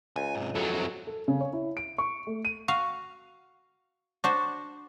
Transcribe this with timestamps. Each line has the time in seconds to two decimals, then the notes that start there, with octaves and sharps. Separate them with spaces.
0.16 C#2 G#5
0.35 G#2 C3
0.55 F2 F#3 E4 G#4 A4
0.74 C4 E4
1.07 A4
1.28 C#3
1.41 C#5
1.53 E4
1.77 D7
1.98 C#6
2.27 A3
2.45 D#7
2.68 F#4 F5
4.24 D4 F#4 C5